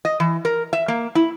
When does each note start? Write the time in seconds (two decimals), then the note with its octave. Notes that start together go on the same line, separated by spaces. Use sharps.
0.05 D#5
0.20 E3
0.45 A#4
0.73 E5
0.88 A#3
1.15 E4